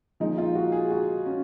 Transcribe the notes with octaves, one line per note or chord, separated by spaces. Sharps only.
A#2 F3 G#3 D#4
F4
F#4
G#4
F#4
C#4